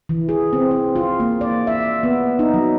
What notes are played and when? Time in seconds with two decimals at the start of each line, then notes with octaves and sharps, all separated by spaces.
0.09 E3
0.29 G#4
0.53 C4
0.71 C4
0.96 F4
1.20 A#3
1.41 D5
1.67 E5
2.03 B3
2.39 D#4
2.54 F#3